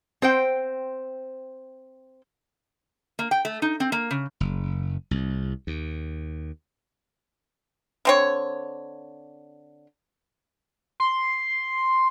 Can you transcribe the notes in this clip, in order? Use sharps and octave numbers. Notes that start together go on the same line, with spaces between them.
C4 C5 G5
A#3
G5
A3
D#4
C4
A#3
C#3
F#1
C2
D#2
D3 C4 C#5
C6